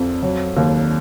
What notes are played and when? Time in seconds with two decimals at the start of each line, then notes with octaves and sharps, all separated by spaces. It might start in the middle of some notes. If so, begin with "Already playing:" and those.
Already playing: F2
0.22 F#3
0.57 D#2